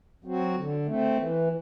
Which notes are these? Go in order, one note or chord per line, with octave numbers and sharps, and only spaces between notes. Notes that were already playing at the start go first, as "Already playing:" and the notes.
F#3 C4 F#4
D3
A3 C4
E3